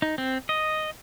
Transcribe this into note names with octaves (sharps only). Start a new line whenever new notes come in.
D#4
C4
D#5